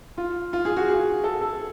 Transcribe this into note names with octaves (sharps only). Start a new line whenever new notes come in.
F4
F4
G#4
F#4
G#4
A4
A4